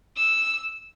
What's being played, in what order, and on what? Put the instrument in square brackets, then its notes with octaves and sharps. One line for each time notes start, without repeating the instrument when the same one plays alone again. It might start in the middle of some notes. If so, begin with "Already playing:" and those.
[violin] E6